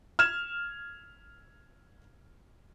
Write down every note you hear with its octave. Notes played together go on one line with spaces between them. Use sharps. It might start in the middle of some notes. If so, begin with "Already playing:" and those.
F6 G#6 E7